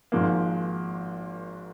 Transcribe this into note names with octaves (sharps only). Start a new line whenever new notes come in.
G#1 G#2 F3 A#3